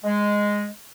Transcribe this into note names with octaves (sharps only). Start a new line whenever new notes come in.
G#3